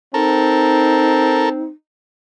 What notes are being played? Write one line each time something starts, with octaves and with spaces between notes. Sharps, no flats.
C4 D#4 A4 A#4